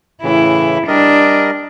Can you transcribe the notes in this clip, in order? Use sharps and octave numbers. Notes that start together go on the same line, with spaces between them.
A2 C#3 E3 E4
G3 D4 A#4 D#5